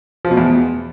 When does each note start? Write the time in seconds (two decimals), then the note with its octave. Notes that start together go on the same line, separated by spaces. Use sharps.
0.25 F3
0.31 B2
0.37 E2